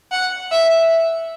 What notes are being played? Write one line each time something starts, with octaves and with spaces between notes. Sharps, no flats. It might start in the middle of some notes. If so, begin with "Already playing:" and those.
F#5
E5